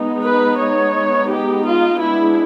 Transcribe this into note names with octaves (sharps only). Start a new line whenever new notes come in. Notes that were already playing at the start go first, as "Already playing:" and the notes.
Already playing: G#3 B3 D#4
B4
C#5
G4
F4
G#3 B3 D4 E4